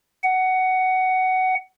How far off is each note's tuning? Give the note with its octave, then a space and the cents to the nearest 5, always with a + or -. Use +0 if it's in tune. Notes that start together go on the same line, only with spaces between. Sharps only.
F#5 +15